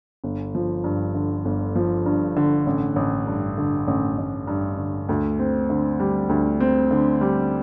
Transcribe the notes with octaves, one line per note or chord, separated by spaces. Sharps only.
G1
F3
G2
D3
G1
F3
G2
D3
A1
A1
G2
D3
A1
A1
G2
D3
D2
C4
D3
G3
D2
C4
D3
G3